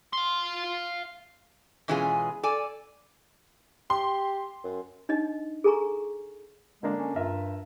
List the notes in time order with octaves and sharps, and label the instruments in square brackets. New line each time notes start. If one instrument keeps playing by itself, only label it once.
[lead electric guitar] F5 C6
[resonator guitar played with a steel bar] B2 E3 G#3 C#4 F4 G#4
A4 D5 G#5
[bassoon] G4 [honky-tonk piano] C6
[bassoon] F#2
[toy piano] D4 D#4 D#5
G#4 A4 G#5 A#5 C#6
[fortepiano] D3 A#3 D4 [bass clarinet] G#3
[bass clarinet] C#4
[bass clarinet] G2 [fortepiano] F4 A#4 E5